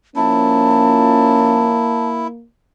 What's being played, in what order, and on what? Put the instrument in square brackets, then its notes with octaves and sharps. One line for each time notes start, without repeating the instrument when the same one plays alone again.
[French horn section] F3 C#4 [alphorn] A#3 [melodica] E4 [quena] A5